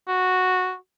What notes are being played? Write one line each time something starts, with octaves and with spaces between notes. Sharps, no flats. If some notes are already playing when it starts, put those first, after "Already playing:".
F#4